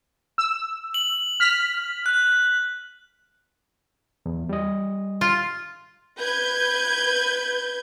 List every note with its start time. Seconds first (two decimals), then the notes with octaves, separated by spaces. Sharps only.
0.38 E6
0.94 F#7
1.40 F6 B6
2.06 F#6
4.26 E2
4.49 G3 D#5
5.21 F4
6.18 B4 G6 G#6